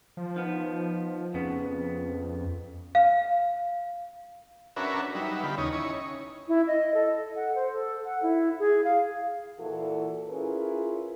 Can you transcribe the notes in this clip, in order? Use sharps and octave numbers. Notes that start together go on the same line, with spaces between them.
F3
D#3 B3
F2 C#3 B3
F5
C#4 D4 F#4 A#4 B4 E5
F#3 G3 D#4 B4 E5
D3 B3 F4 G4 B5
D#2 C#3 D#4 C#5 D#5
C#4 D#4 E4 C#5
C#4
E4
D#5
A4
F#5
C5
A4
F#5
E4
G#4
F5
A#2 E3 E4 F#4 A4
C#4 E4 F4 G#4 A#4 B4